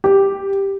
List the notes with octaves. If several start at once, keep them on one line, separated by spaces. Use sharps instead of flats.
G4